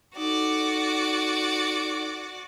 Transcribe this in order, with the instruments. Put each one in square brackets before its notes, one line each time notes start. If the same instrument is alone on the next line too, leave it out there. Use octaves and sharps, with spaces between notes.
[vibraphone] D#4 A4 [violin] F#4 D5